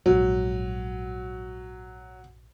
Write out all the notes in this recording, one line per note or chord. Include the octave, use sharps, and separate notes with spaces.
A#1 G#2 F#3